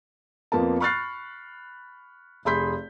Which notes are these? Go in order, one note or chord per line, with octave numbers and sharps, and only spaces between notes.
F2 F3 A#3 B3 A5
B5 C#6 F6 F#6 A6 C7
F1 G#4 B5 C6 G6 B6